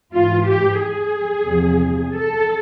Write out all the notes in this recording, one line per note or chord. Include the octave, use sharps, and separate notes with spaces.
G#2 E3 F4
G4
G#4
E2 C3 F3
A4